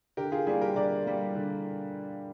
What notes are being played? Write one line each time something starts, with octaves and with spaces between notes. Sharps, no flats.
D3 G4 A#4
F4 G#4
G3 A#3 F4 G#4
G4 A#4
D3 A#4 D5
G3 A#3
D3